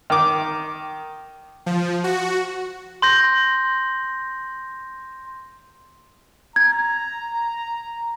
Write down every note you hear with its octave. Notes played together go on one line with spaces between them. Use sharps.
D#3 D6
F3
F#4
C6 G6 A#6
A#5 G#6